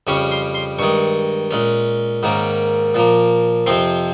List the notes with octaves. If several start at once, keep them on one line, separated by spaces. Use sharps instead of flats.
F2 C#3 G3 C#4 C#6
C6
C6
G2 D#3 G#3 C#6
A#2 G#3 C#4
G#2 D#3 A#3 C#4
A#2 F3 A#3
F2 C3 F3 C4 C6